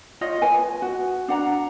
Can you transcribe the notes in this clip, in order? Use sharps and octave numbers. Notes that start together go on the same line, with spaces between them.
F4 C#5 D#5
B4 G#5
F#4
D4 F#5 A#5